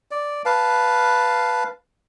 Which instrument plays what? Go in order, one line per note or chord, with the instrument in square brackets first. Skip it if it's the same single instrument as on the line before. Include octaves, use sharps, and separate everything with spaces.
[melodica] D5
B4 F5 A5